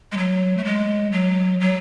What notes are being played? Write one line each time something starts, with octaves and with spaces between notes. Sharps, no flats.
G#3
F#3
A3
G#3
F#3
F#3